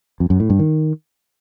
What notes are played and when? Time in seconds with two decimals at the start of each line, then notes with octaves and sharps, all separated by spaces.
0.20 F2
0.30 F#2
0.40 A2
0.50 G2
0.59 D#3